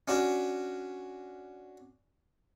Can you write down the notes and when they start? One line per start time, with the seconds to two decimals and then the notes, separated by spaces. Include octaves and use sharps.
0.08 C#4 D4 F#4